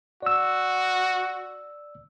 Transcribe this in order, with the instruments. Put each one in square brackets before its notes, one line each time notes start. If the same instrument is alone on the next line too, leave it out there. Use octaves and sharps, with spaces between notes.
[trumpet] F#4 [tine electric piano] D5 E6